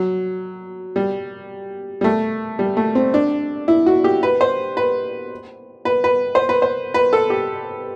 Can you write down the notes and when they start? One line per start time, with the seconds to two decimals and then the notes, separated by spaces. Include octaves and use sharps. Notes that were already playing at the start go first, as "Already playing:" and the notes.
Already playing: F#3
0.96 G3
2.01 G3
2.04 A3
2.59 G3
2.77 A3
2.95 C4
3.14 D4
3.68 E4
3.86 F#4
4.04 G4
4.23 B4
4.41 C5
4.77 B4
5.85 B4
6.04 B4
6.35 C5
6.49 B4
6.62 C5
6.94 B4
7.13 A4
7.30 G4